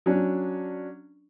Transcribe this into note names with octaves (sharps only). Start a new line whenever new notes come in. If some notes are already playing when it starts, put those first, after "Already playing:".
F#3 C#4 D4